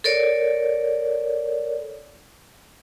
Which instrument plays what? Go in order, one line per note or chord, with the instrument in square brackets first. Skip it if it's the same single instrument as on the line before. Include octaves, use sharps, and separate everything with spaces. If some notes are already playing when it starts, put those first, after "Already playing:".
[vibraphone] A4 A#4 C#5 D5